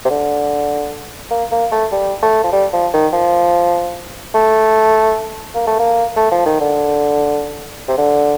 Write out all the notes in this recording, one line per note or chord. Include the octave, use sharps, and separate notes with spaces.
C3
D3
A#3
A#3
A3
G3
A3
F3
G3
F3
D#3
F3
A3
A#3
A3
A#3
A3
F3
D#3
D3
C3
D3